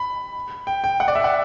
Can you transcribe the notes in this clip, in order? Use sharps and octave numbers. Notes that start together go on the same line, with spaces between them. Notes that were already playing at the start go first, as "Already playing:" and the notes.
Already playing: B5
G5
G5
F#5
D5
E5
F#5